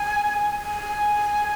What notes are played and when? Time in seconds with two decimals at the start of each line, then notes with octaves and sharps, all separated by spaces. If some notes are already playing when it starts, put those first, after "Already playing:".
Already playing: G#5
0.62 G#5